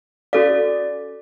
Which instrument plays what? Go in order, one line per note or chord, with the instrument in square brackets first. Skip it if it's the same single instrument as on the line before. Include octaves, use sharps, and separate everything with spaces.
[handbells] C#4 D5 [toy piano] F#4 A4 F5